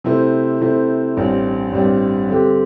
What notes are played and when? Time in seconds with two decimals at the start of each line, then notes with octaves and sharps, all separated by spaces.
0.04 C3 A3 E4 C5
0.61 C3 A3 E4 C5
1.17 A1 G2 G3 C4
1.73 A1 G2 G3 C4
2.29 G2 D3 C4 G4